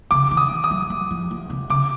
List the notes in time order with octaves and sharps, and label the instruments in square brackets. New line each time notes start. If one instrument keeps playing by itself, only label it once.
[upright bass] C#3 [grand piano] D6
[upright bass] D#3
[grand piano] D#6
[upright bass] E3
[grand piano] D#6
[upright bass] F#3
F#3
F3
F3
C3
[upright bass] C#3 [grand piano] D6